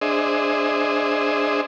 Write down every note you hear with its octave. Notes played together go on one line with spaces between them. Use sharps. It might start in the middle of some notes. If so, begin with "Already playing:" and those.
D4 G#4 C5 D#5 E5